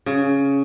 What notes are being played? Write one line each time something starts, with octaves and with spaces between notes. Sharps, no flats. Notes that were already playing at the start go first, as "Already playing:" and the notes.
C#3